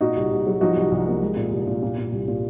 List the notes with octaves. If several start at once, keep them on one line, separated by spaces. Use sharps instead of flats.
A#2 D#4 F#4
C2
C2
F#3
F3 D#4 F#4
C2
C2
A#3
G#3
A#2
C2
A#2
A#2
A#2
C2
A#2